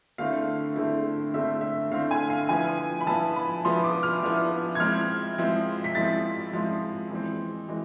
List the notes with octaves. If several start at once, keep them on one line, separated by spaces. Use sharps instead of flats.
D3 A3 C4 E4 F5
D3 A3 C4 E4
D3 A3 C4 E4 E5
E5
D3 A3 C4 E4 F5
G#5
F5
F3 B3 E4 G#5
B5
F3 B3 E4 A5
B5
F3 B3 E4 C6
D6
F6
F3 B3 E4
G#6
F3 G#3 C4 E4 F6
F3 G#3 C4 E4
B6
F3 G#3 C4 E4 A6
F3 G#3 C4 E4
E3 G#3 C4
E3 G#3